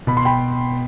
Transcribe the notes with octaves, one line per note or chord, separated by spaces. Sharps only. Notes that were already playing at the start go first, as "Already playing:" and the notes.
B2 B5
C6
G5 B5